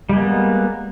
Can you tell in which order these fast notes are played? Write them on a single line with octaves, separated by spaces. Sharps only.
G3 G#3 A#3 B3